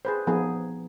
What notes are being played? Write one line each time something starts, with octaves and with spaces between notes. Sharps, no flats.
G#4 B4 C5
F3 B3 D#4 G#4